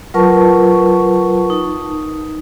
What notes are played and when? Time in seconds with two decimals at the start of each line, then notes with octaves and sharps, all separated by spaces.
0.14 F#3 F4 A#4 B4 A5 C#6
1.50 D#4